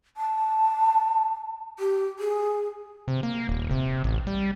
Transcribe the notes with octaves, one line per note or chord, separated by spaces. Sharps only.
A5
G4
G#4
C3
A#3
D#1
C3
A1
G3